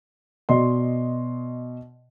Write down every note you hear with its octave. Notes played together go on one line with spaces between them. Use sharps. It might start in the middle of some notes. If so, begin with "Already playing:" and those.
B2 D5 D#5 C6